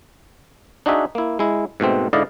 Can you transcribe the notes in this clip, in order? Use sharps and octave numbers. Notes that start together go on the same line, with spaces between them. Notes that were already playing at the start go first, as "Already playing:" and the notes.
D4 D#4 F#4 G#4 E5
A#3 E4
G#3 E4
G#2 B2 A3 C4
G#2 D3 E4 D5 D#5 F5